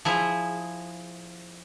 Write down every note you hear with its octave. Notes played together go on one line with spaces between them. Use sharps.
F3 E4 G#4